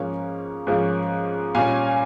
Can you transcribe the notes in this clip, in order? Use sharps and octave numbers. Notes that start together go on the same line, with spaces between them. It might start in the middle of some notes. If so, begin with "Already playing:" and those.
Already playing: G#2 F3 A#3 C#4
G#2 F3 A#3 C#4
A#2 G3 C#4 F5 G#5